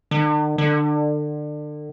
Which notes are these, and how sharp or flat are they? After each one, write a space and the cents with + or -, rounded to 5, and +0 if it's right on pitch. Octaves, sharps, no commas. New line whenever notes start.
D3 +45
D3 +30